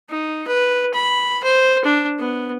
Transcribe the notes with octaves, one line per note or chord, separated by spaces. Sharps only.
D#4
B4
B5
C5
D4
B3